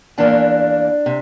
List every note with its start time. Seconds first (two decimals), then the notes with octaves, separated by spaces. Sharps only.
0.18 E2 E3 A#3 D4
1.06 C3